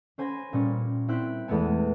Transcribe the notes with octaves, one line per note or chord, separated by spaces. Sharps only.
C#4 C5 G#5 B5 G#6 A#6
A#2 G3 C#4
C4 E4 G5 F#6 B6
E2 G#3 A3 B3 G#5